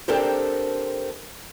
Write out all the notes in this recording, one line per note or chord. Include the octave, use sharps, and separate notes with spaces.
C4 D4 G4 A4 A#4 C5